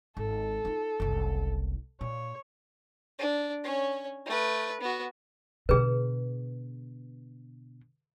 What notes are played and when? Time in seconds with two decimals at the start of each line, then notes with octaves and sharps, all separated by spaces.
0.17 G#1 A4
0.65 D#4 F4
1.00 F#1 C2
2.01 A#2 C#5
3.19 D4
3.64 C#4 C#5
4.26 A3 B4
4.81 B3 F#4
5.69 B2 D3 G#4 B4